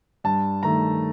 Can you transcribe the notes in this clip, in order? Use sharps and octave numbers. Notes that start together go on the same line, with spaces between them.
G2 A5
D#3 A3 A#5